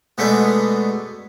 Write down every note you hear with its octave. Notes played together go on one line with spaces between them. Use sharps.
B2 G#3 A3 B3 D4